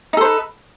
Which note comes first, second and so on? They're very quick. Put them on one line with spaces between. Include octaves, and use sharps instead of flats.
D#4 A4 C5 B4